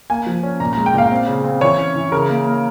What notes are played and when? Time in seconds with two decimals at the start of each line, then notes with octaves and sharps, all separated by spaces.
0.10 A#3 G#5
0.26 F3
0.43 C#4
0.60 A#2 A#5
0.73 A#5
0.77 G#3
0.86 G5
0.94 A#2 F5
1.11 C4
1.27 C#3
1.44 C4
1.61 E3 C#5
1.78 C#4
1.95 E3
2.12 C#3 A#4
2.29 A#3
2.46 A#3